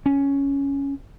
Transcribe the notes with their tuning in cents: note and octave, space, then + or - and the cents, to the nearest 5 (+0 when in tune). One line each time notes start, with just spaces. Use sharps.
C#4 +5